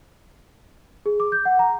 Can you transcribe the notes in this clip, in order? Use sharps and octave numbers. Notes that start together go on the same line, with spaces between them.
G#4
D6
G6
F#5
A#5